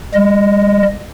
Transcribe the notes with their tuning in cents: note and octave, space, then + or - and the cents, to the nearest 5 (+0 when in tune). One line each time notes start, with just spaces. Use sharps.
G3 +45 D#5 +0